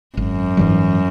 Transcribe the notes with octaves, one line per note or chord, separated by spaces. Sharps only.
G#1 F#2
G#2 E3 G3